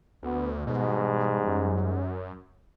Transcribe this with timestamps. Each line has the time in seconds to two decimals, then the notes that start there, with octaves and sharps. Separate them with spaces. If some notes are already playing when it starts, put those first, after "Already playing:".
0.23 D2 B3
0.67 E2 G#2 B2 G3
1.47 F#2